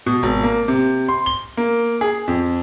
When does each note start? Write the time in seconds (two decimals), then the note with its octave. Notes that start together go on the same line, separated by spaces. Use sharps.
0.06 B2
0.23 G#1
0.43 A#3
0.68 C3
1.09 C6
1.26 G7
1.57 A#3
2.01 G#4
2.28 F2